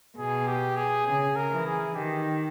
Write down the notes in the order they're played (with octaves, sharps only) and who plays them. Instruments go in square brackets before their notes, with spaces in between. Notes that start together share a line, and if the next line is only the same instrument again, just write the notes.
[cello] B2 [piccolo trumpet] G#4
[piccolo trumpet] G4
G#4
[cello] C#3 [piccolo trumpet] G#4
[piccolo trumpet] A#4
[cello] E3
[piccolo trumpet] G#4
[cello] D#3 [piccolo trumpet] G4